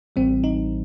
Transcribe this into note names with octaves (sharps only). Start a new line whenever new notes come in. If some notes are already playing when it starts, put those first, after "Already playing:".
A1 A2 E3 G3 C4
D#4